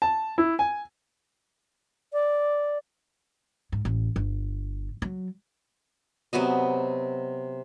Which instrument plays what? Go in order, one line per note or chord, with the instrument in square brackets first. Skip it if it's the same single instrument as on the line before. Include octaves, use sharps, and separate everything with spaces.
[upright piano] A5
E4
G#5
[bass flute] D5
[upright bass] G#2
A1
G1
F#3
[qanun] C3 F#3 B3 D#5